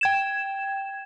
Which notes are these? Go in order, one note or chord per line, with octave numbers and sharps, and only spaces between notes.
G5 G#6 E7